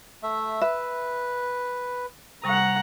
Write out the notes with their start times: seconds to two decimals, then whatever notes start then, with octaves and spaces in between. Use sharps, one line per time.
0.23 A3 E5
0.61 B4 E5
2.44 C3 G3 F#5 A#5 C#6